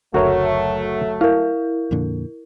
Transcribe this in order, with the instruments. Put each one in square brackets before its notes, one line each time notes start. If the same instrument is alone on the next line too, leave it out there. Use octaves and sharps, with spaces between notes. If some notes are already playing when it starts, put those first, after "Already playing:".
[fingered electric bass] F#1 D2 [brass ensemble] F#3 A3 [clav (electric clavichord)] F#4 A#4 C#5
[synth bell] E4 A#4 [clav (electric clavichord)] F5
[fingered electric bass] F2 A#2 D3